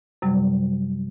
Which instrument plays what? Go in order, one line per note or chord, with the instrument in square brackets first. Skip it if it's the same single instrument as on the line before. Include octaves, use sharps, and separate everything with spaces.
[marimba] F#2 C3 F#3 G3